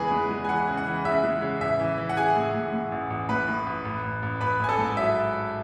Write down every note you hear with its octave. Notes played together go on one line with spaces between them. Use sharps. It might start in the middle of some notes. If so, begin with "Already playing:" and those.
Already playing: E2 C#3 E3 G#3 G#4 B4 G#5 B5
G#3
G#3
G#5
E3 F#5
C#3
F#5
E3
C#3 E5
G#3
C#3
A1 E5
E3
E3
F#5
E3 G#4 G#5
A2
A2
A2
A1
A1
A2 B4 B5
A2
A1
A1
A1
A1
A1 B4 B5
A1 G#5
A4 A5
G#2
F#3 E5